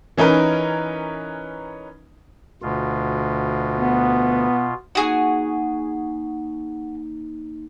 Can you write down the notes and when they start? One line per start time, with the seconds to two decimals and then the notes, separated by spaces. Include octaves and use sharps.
0.17 E3 C#4 D#4 A#4 B4
2.62 D2 B2 F4
3.78 B3
4.95 A#3 D#4 F#4 G#4